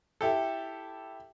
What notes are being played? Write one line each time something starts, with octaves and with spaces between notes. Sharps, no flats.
E4 G4 A4